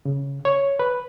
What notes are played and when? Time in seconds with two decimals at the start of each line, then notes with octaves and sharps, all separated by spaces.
0.05 C#3
0.45 C#5
0.79 B4